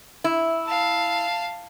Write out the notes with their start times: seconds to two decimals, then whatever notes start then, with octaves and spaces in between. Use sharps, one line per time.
0.24 E4
0.66 F5 A5